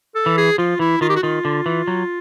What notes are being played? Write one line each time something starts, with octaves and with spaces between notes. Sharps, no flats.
A4
E3
G#4
F3 F4
E3 E4
D#3 F4
G4
F#4
D#3 F4
D3
E3
F#3